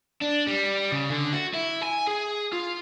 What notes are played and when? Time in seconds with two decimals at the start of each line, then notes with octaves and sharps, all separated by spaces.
0.21 D4
0.47 G3
0.92 C#3
1.10 D3
1.33 F#4
1.54 E4
1.83 G#5
2.07 G#4
2.53 F4